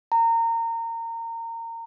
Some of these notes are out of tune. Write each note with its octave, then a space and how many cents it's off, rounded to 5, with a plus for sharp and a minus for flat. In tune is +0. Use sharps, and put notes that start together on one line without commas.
A#5 -25